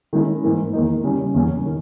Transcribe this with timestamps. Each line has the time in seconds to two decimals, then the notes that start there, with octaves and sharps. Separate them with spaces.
0.13 D#3 G#3 C#4 E4
0.44 G#2 E3 A#3
0.73 E2 D#3 A#3 D#4
1.04 C#3 G3 C#4
1.34 E2 C#3 G3 C#4
1.66 D#3